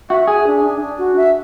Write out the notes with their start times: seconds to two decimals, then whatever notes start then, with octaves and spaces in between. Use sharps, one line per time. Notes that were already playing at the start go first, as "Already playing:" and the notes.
0.09 F#4 E5
0.27 G#4 G#5
0.45 D4
0.63 D4
0.80 D4
0.98 F#4
1.16 E5